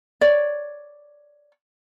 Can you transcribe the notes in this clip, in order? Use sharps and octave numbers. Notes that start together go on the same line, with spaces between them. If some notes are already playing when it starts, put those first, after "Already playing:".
C#5 D5